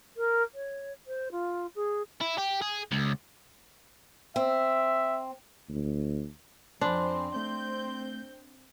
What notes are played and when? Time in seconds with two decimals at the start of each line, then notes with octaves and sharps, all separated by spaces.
0.17 A#4
0.54 C#5
1.07 C5
1.32 F4
1.75 G#4
2.21 E4
2.38 G4
2.62 G#4
2.92 C#2
4.36 C4 E5
5.69 D2
6.81 F2 C4 D4 C5 G#5 B5 C6
7.36 A3 C4 G6